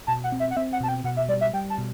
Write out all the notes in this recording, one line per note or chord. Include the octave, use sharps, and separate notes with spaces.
B2 A5
F#5
C4
E5
F#5
C4 E5
F#5
B2 A5
G5
B2 F#5
E5
G3 D5
E5
G3 G5
A5
B2